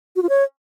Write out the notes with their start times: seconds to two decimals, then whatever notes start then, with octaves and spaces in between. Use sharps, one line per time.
0.16 F#4
0.23 F4
0.29 C#5